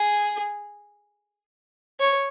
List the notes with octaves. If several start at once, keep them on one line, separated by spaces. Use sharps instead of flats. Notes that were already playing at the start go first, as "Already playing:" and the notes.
Already playing: G#4
C#5